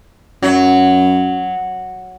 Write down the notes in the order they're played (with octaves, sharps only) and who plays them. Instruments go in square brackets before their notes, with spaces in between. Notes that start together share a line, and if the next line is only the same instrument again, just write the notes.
[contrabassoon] F#2 [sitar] F#3